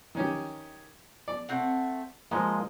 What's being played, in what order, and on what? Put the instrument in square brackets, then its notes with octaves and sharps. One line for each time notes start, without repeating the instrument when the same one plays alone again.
[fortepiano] D#3 C#4 G4
D5
[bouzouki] A3 C4 F#5
[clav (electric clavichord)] F3 G#3 A#3 [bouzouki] D#5